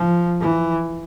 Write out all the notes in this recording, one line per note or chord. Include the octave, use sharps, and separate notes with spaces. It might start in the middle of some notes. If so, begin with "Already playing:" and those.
Already playing: F3
E3